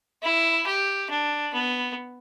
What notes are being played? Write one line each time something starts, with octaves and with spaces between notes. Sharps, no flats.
E4
G4
D4
B3